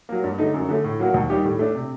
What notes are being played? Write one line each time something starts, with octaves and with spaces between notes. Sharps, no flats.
F#3 A#3
G2
D3 A3 D#4
F#2
D3 A3
A2
F#3 A#3 F#4
D#2
D#3 G3 D4 G4
A2
A3 D4
C3